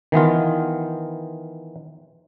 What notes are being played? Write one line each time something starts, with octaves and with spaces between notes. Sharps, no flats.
D#3 E3 B3 F4